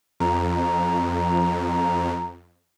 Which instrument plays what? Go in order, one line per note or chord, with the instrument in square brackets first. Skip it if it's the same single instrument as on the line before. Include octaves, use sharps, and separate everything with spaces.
[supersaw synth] F2 [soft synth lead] A#5